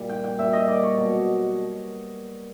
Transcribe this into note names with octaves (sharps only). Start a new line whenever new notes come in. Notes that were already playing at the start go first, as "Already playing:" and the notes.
Already playing: A#2 G3
G5
G5
A#2 G3 E5
D#5
D5
C#5
B2 F#3